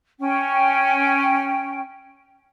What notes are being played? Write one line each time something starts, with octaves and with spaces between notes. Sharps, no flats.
C#4 G5